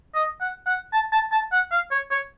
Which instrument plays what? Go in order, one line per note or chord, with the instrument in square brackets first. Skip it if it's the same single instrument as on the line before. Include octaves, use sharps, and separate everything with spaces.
[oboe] D#5
F#5
F#5
A5
A5
A5
F#5
F5
C#5
C#5